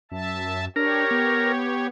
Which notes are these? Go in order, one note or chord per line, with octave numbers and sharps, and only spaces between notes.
F#2 E5 A5
D4 G4 A#4 C#5
B3